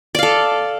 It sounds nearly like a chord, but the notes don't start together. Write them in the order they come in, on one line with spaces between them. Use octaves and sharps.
D5 F5 A4